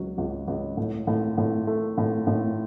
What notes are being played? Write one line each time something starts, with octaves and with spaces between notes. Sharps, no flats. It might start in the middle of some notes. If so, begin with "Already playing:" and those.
Already playing: C#2 F#3
C#2
C#2
A2
A2
A2
A3
A2
A2